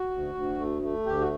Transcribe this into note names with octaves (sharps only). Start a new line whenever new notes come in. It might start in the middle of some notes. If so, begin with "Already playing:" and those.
Already playing: F#4
D2
D2
A3
A3
D2 G4
F#4